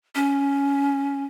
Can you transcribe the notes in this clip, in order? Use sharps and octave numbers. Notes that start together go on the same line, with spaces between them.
C#4